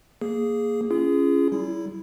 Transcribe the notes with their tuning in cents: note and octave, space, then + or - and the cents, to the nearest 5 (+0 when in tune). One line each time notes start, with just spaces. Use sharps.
A#3 +0 G#4 +0
C#4 +0 F4 -40 G#4 +0
G3 -45 E4 +0